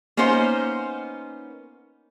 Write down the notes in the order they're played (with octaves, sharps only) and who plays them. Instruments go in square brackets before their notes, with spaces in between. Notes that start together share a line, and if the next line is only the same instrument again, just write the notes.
[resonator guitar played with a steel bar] A#3 B3 C#4 D#4 C5